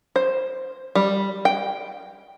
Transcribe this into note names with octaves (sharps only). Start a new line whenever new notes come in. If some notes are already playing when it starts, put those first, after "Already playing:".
C5
G3
G5